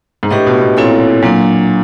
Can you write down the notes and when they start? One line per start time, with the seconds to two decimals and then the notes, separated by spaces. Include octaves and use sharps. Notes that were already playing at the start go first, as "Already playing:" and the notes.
0.23 G#2
0.31 A2 D4 G4 B4 D#5
0.47 B2
0.62 B2
0.77 A#2 C4 E4 A4 C#5
1.22 A#2 F#3 A#3 D4